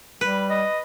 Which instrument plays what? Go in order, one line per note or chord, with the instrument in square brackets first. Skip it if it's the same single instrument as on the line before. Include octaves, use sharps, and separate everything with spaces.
[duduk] G3 [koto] B4
[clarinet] D#5